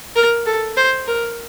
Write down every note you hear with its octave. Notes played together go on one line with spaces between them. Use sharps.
A#4
A4
C5
A#4